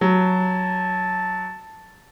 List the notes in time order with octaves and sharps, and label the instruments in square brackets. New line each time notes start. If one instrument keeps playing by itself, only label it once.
[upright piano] F#3 [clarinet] A5